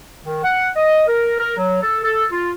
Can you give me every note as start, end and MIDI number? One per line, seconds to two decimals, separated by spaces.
0.24 0.44 51
0.44 0.69 78
0.76 1.05 75
1.08 1.38 70
1.39 1.54 70
1.57 1.79 54
1.82 1.99 69
2.04 2.27 69
2.32 2.53 65